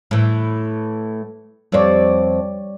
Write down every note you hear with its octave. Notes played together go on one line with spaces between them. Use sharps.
A2 E3
F2 G3 C4 C#5 D5